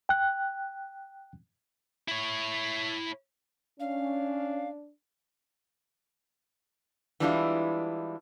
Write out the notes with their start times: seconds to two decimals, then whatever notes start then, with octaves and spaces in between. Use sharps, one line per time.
0.09 G5 F#6
2.08 E4 C#5
3.80 C#4 D4 F5
7.20 E3 G3 G#3 D4 E4 F4